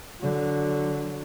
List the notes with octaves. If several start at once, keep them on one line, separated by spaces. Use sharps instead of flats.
D3 F#3